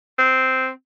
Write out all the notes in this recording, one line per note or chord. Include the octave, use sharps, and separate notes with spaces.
C4